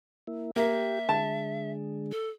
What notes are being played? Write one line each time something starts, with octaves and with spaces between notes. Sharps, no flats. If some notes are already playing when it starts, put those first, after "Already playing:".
A#3 E4
A#3 G4 E5
D3 G#3 A5
A4